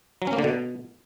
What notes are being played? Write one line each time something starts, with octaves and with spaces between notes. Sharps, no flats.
F#3
C#4
A#3
D3
B2